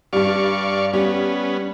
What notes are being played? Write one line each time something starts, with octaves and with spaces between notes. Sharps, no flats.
G2 G3 D5 F5 C#6
G3 B3 C#4